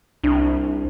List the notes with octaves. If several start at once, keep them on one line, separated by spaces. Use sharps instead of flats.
C2 D4